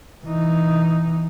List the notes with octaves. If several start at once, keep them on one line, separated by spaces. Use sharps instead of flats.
E3 D#4